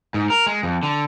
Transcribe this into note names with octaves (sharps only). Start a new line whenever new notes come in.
G#2
A#4
G#3
F2
D3